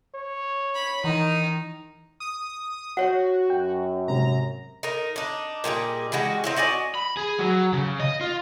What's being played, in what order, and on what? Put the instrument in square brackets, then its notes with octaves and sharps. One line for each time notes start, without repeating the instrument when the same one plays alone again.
[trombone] C#5
[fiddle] B5
[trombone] D#3 [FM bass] E3 [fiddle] D#4
[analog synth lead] D#6
[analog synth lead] F#4 [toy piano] C#5 F#5
[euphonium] F#2 [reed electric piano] G5
[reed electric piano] G#2 C3 [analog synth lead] A#5
[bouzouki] D#4 A#4
D4 D#4
A#2 G3 D#4 G#4
E3 G3 G#3 F#4
C4 D#4 E4
F#4 D5 D#5 G#5
[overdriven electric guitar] B5
G#4
F#3
C#3
D#5
F4